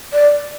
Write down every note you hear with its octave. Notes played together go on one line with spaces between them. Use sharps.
D5